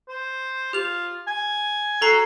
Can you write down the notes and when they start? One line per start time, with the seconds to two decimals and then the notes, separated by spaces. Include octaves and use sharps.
0.08 C5
0.73 F4 G4 F7
1.27 G#5
2.01 F#4 A4 A#5 C7